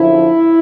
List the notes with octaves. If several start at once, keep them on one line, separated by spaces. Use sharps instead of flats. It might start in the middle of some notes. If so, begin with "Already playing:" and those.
Already playing: F#2 D3 F3 E4